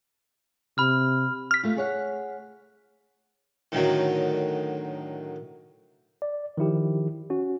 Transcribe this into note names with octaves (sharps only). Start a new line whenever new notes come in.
C3 B5 F6
F6 B6
A3 F4
G#4 C#5 F#5
A2 D3 D#3 F#3
D5
D#3 F3 E4 G4
C#4 F#4